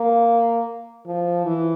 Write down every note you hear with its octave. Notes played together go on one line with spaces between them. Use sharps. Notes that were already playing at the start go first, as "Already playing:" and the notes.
Already playing: A#3
F3
E3